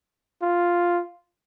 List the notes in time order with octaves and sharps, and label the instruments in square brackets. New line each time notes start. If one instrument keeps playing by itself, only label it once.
[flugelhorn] F4